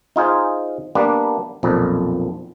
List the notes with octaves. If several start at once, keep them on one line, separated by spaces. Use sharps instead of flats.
D#4 F4 G#4 C5
G3 A#3 B3 D4
B1 F2 A#2